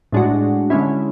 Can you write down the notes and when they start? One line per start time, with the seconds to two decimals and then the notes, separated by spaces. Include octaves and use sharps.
0.12 A2 G#3 D4 F#4
0.70 D3 G#3 C#4 E4